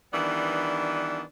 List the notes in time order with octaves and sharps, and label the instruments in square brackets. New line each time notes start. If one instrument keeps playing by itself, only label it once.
[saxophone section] D#3 E3 G3 B3 D4